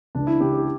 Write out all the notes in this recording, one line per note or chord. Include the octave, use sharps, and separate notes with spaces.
C#2 D4
E4
C#3 G4
G4